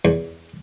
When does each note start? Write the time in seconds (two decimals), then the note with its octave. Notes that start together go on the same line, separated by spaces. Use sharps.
0.05 E2